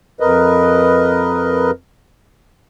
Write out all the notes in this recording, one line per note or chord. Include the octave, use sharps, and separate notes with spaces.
F2 A#4 B4 D#5